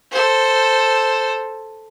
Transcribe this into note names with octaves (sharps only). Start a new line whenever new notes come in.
A4 C5